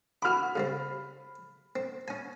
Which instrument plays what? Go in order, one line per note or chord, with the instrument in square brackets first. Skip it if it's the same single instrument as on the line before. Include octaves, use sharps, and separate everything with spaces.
[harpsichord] F#4 D6 [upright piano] B5 F6
[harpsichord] C#3 G3 C4
C4
C#4 G#5